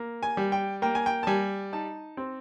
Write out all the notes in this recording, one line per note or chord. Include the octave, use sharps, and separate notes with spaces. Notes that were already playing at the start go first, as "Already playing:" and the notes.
Already playing: A#3
G#5
G3
G5
A#3 G5
G#5
G5
A5
G3 G#5
D#4 A5
C4